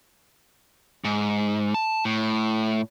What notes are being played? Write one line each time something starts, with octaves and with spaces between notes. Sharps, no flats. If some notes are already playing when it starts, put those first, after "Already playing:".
G#2
A5
A2